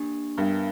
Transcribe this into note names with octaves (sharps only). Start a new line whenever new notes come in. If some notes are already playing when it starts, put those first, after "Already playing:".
Already playing: A#3 D4 G4
G2 B3 D4 A#4 E5 G5